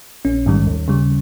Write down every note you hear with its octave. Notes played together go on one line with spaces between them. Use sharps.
A#1 C#4
G#2 D#3 G3
D#2
C#3 G3